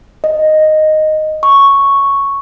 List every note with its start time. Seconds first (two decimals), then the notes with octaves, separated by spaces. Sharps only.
0.24 D#5
1.43 C#6